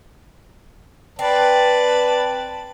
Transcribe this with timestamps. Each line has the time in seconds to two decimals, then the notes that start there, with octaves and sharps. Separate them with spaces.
1.19 C4 B4 D5 A5